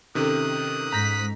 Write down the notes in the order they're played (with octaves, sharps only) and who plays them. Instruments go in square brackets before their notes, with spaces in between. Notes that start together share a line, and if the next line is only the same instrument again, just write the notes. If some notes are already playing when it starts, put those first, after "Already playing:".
[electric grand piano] C3 D#3 [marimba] C#4 A4 [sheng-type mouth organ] D#6 F#6
[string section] G#2 B6 [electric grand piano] A#5 A#6 [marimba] G6